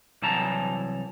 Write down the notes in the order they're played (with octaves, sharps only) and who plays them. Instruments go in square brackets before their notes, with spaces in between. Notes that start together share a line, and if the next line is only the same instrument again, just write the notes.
[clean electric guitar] C2 E3 F#3 A5 A#5